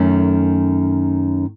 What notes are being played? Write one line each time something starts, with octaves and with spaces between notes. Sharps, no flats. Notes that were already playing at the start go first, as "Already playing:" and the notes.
Already playing: F#2 D#3 A3 C#4